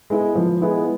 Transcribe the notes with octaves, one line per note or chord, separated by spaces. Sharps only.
G#3 B3 E4
F3
G#3 B3 E4